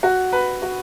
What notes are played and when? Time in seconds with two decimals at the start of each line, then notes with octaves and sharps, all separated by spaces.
0.03 F#4
0.32 B4
0.62 F#4